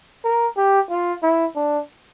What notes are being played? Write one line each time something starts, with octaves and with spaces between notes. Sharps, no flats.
A#4
G4
F4
E4
D4